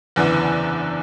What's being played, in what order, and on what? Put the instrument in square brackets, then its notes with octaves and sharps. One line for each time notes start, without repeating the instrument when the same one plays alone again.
[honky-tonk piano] F#1 E2 D3 [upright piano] E3